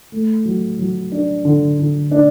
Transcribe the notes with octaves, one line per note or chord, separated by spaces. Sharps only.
A3
F#3
F#3
D4
D3
D3
D4